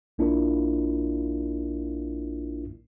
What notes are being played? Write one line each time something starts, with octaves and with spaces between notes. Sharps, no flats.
A#1 A#3 D4 E4 F4 A#4